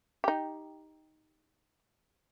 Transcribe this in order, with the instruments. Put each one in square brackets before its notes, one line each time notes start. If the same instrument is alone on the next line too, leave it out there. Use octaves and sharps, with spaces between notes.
[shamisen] D#4 G4